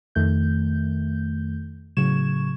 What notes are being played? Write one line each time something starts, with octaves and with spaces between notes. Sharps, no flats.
F2 D#3 A3 G6
A2 C#3 F#3 C#6 G#6 E7